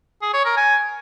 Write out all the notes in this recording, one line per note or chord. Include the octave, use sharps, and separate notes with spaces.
G#4
C#5
A#4
G#5